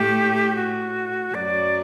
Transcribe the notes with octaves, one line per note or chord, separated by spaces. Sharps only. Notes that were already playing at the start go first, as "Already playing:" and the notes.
Already playing: A2 A3 G4
F#4
F#2 F#3 D5